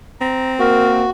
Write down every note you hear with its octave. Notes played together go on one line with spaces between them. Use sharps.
C4 A#5
A#3 F#4 A#4